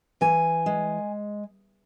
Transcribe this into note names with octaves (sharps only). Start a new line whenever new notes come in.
E3 G#5
G#3